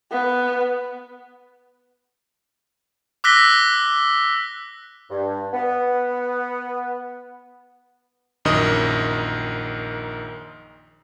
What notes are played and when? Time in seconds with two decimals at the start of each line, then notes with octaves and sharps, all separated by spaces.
0.12 B3
3.24 D6 E6 F#6 A#6 B6 G7
5.10 G2
5.53 B3
8.45 A#1 F#2 D#3 D#5 D#6